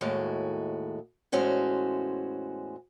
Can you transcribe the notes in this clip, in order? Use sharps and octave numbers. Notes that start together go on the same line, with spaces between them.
D#2 A2 G#3 F#4
E2 A2 G#3 C#4 F#4 C5